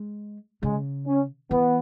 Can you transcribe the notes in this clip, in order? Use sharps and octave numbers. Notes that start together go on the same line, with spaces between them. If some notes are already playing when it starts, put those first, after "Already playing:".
Already playing: G#3
C#3 G#3
C#4
E3 B3